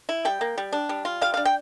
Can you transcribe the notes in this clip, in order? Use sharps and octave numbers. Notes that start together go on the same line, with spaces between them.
E4
G3 G5
A#3
G3
D4
G3
F4
G3 F5
D4 F5
G5